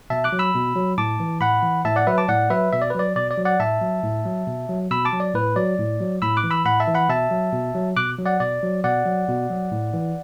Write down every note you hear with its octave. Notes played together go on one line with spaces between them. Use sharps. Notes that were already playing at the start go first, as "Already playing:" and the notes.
B2 E5 A5
D6 F#6
F#3
B5 E6
B2
F#3
A2 A5 D6
E3
A2 F#5 B5
E3
A2 E5 A5
D5 F#5
F#3 B4 E5
A5 D6
A2 D5 F#5
F#3 B4 E5
B2 E5
D5
B4
F#3 D5
B2 D5
D5
F#3
D5 F#5
A2 E5 A5
F#3
A2
F#3
B2
F#3
B2 B5 E6
A5 D6
F#3
D5
A2 B4
F#3 D5
A2
F#3
A2 B5 E6
D6 F#6
E3
B5 E6
A2 F#5 B5
E5 A5
E3
F#5 B5
B2 E5 A5
F#3
B2
F#3
B2 D6 F#6
F#3
D5 F#5
B2 D5
F#3
B2 D5 F#5
F#3
B2
F#3
A2
E3